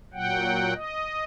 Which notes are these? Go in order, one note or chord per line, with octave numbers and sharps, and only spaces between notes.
A#2 F#3 F#5 G5
D#5